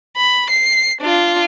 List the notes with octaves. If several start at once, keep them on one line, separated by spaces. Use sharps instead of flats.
B5
C7
D4 F4